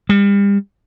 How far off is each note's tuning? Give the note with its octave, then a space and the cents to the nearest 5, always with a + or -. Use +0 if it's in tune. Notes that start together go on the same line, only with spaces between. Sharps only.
G3 +40